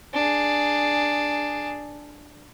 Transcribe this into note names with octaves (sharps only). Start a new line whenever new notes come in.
D4 G#4